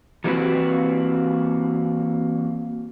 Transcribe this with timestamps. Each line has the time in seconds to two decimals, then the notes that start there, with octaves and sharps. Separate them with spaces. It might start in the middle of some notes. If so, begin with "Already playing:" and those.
0.24 E3 G3 A#3 C4 F#4 B4